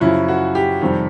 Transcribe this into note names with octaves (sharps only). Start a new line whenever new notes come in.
F#2 C#3 F3 E4
F#4
G4
F2 C3 D#3 G3